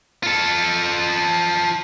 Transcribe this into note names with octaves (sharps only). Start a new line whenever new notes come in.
F4 A4